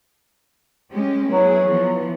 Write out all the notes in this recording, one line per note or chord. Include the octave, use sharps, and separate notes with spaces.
G#3 C#4 G4
F#3 B3 E4 G#4
E3 F3 B3